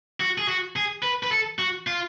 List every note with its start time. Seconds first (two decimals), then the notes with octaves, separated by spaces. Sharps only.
0.20 F#4
0.38 G#4
0.48 F#4
0.76 G#4
1.03 B4
1.23 B4
1.31 A4
1.59 F#4
1.87 F4